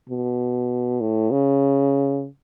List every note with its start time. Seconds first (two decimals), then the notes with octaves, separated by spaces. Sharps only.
0.09 B2
1.01 A2
1.31 C#3